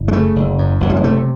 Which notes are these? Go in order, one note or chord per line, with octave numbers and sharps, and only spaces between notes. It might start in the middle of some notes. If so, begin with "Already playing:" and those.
Already playing: F#1
G#3
C#3 A3
F#1
F#2
F#1 F#3
G3
G#3
C3 A3